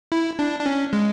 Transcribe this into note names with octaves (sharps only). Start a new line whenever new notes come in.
E4
D4
D4
C#4
G#3